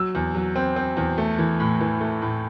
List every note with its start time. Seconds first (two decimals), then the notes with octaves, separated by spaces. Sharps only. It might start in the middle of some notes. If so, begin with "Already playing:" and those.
Already playing: F#3 E6
0.15 E2
0.34 F#3
0.56 C4
0.76 C4
0.97 E2
1.18 A3
1.38 E3
1.60 A2
1.81 E3
2.01 A3
2.22 A2